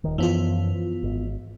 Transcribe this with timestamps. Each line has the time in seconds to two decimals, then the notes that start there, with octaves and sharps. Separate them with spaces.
0.04 D#1 D#3
0.18 F#2 E3 F3 B3 F4
1.03 G#1